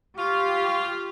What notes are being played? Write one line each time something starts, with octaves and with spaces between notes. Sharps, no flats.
F4 G4 C#6